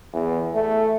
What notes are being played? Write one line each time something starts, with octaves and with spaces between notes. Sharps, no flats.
E2
A3